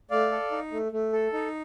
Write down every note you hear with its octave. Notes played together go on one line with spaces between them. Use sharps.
A3 D5 F5
A4
D#4
A3
A3
A4
D#4